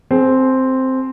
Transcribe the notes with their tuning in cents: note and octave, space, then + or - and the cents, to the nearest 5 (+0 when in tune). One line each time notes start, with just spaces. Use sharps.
C4 +0 G#4 +35